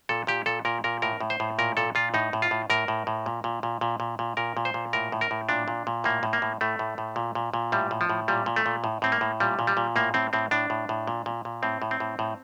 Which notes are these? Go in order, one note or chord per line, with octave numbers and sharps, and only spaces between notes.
A#2 A4
A#2 G4
A#2 A4
A#2 A#4
A#2 A#4
A2 A#4
A2
C5
A2
A#2 A#4
A#2 A4
A#2 F4
A2 D#4
A2
F4
A2
A2 A#4
A2
A2
A#2
A#2
A#2
A#2
A#2
A#2
A#2 A#4
A#2
C5
A#2
A2 A#4
A2
A#4
A2
A#2 D4
A#2
A#2
A2 A#3
A2
A#3
A2
A2 A3
A2
A2
A#2
A#2
A#2
A2 G3
A2
F3
A2
A#2 G3
A#2
A3
A#2
A2
A2 C4
A#3
A2
A#2 G3
A#2
G3
A#2
A2 A#3
A2 C4
A2 C4
A2 D4
A2
A2
A#2
A#2
A#2
A2 C4
A2
C4
A2
A2